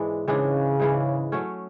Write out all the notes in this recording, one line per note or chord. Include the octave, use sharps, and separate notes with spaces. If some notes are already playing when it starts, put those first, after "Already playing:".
Already playing: G#2 E3 G#3 D4
G#2 C#3 E3 G#3 D4
G#2 E3 G#3 D4
F#3 A3 C#4